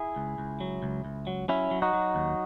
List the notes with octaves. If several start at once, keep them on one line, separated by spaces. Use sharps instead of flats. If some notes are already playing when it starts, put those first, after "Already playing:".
Already playing: E4 G#4
C#2
C#2
F#3
C#2
C#2
F#3
F#3 C#4 E4
F#3
D#4 F#4
F#3
D#2